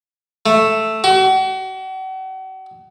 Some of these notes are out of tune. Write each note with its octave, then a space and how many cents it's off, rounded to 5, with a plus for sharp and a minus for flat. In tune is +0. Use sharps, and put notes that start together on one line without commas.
A3 +0
F#4 +40